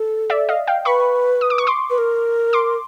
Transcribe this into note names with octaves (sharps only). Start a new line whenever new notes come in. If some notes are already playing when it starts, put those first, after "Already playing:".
Already playing: A4
D5 E5
D#5 F5
F5 G5
B4 B5 C#6
D#6
D6
C#6
C6 D6
B4
A#4
C6 D6